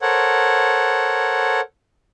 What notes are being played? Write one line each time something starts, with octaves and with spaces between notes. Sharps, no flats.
A4 A#4 C5 C#5 F#5